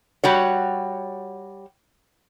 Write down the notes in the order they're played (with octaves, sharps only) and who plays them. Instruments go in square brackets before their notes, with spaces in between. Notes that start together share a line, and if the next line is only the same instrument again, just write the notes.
[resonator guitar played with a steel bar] G3 F#4 C#5